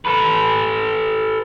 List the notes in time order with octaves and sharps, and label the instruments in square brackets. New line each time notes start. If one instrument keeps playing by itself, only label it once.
[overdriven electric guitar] A4 B4